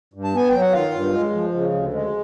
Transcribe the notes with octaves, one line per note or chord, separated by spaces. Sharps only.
G2
A5
B3 G#5
F#3 G5
F#5
D#3 F4 F5
G2
G#3
F3
C#3
D2
G#3